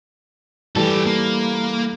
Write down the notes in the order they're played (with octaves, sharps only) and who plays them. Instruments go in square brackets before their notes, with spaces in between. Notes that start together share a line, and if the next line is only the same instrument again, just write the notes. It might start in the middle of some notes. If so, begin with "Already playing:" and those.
[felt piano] E3 G3 A3 [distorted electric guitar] G4 A4
[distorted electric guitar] A#3